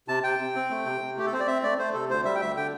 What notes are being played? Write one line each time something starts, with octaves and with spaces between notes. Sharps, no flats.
C3 A5
C3 G5
C3
C4
A3
C3
C3
A3 G4
A4
C4 C5
D5
C4 E5
A3 D5
A3 C5
C3 A4
D2 C5
G3 E5
G5
D2 E5
D3 G5